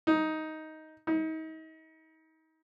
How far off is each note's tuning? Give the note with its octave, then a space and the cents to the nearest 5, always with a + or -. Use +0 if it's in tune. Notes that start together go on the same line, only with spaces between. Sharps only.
D#4 +10
D#4 +35